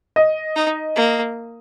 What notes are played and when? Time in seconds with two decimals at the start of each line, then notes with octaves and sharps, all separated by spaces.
0.16 D#5
0.56 D#4
0.96 A#3